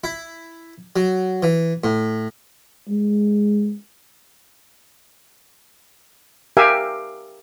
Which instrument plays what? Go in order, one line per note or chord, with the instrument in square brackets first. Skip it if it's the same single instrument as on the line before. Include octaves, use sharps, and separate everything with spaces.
[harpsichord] E4
F#3
E3
A2
[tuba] G#3
[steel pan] G4 A#4 E5 F5 G#5